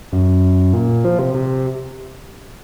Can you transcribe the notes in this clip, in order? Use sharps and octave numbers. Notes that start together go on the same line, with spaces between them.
F#2
A#2
F3
C3
C3